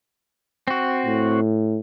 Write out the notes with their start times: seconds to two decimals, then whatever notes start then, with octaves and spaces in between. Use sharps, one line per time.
0.68 C4 F#4
1.06 A2